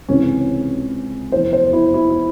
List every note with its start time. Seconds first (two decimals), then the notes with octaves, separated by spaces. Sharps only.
0.09 C#2 C3 E3 C#4
1.32 F1 E2 E3 C5
1.53 C5
1.73 E4
1.94 E4
2.10 E4